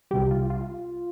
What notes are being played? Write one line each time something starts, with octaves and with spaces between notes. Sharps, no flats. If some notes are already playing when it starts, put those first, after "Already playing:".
C2 C3 G3 G4
F4
F4